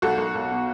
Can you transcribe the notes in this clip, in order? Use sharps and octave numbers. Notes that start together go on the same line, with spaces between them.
B1 F#4 A4
B1
B1
B2